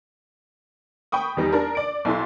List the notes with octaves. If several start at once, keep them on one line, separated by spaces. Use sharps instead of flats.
G5 B5 C#6 D#6
E2 G3 D#4
D4 A#4
D5 D7
B1 E4 A4 C6